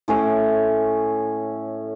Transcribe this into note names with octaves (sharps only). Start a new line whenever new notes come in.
A2 C#4 C#5 D6